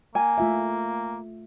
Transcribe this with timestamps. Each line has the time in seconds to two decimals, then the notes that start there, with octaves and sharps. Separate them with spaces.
0.15 A#3 G#5
0.38 A3 F4 E5